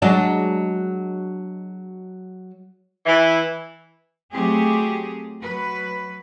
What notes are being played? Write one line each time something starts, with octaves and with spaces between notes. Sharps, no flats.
F#3 G#3 D4
E3
F#3 A3 C4 G4 G#4
F#3 B4